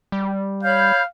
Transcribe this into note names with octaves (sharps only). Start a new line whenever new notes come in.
G3
C#5 F5 B5 G6